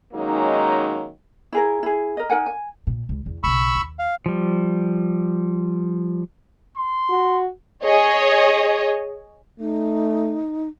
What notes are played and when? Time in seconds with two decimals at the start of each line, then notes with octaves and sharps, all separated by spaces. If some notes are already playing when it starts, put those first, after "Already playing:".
0.13 D#3 F#3 G#3 A#3 C#4 D#4
1.52 E4 G#4 A#4
1.83 E4 G#4
2.17 A#4 D#5
2.30 D#4 A#4 F#5 G#5
2.46 G#5
2.87 A#2
3.09 C#2
3.26 E2
3.43 B1 C#3 B5 C#6 E6
3.75 D#2
3.99 F5
4.26 F3 G3
6.77 C6
7.10 F#4
7.83 G#4 C#5 D#5
9.60 A3 D#4